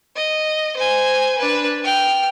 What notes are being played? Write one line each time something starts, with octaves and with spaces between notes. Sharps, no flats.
D#5
C5 G#5
D4 B4
G5 F6